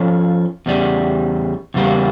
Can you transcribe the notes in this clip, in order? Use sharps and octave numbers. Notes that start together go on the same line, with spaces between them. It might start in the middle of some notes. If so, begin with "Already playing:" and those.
Already playing: F3 C#4 F4 A4 C#5
E2 C#3 G3
E2 C#3 G3 A#3